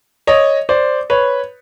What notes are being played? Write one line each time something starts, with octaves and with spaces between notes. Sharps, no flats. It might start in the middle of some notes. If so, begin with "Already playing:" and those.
C#5 D#5
C5 D5
B4 C#5